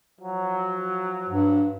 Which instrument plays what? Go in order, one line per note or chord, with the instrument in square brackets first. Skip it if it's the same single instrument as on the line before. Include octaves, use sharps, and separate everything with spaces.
[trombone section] F3 F#3
[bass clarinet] G2